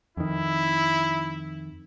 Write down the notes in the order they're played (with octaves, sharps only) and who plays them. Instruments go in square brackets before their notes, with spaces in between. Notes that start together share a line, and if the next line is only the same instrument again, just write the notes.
[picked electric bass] F2 D#3 [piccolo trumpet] E4